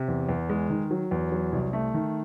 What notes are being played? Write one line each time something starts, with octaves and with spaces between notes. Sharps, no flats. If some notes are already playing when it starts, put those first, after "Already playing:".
Already playing: C3
E2
E2
G#3
D#3
F#3
E2
F#3
C2
A3
D#3